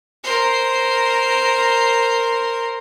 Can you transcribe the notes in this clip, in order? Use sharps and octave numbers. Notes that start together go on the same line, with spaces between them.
A#4 C5